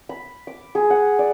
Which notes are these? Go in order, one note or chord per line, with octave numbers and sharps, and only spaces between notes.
B5
D6
G#4
F#5
D5